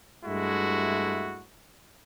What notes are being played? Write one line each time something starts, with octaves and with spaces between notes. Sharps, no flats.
G2 G#3 A3 E4 F#4